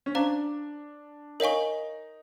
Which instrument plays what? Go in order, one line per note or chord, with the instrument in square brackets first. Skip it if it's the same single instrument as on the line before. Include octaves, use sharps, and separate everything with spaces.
[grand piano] C#4
[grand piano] D4 [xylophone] C5 F5 A#5
[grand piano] D#4 [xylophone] A#4 C#5 F5 G#5 C#6